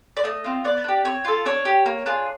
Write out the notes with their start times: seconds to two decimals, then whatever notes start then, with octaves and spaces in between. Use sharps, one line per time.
0.17 D5
0.24 A3 D#5
0.44 C4 F4
0.64 B3 D5
0.84 D4 G4
1.05 C4 C#5
1.25 F4 A4
1.46 D4 C#5
1.65 G4
1.86 A#3
2.06 D4 F4 G#4